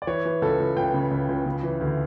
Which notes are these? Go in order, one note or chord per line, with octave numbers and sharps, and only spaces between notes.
D5
E3 C#5
E3
C#2 A4
C#2
C#2 G5
C#3
C#2
C#2
C#3
E3
D2